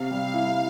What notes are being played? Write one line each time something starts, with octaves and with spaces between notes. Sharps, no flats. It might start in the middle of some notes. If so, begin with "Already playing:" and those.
Already playing: C3 F5
G3
E4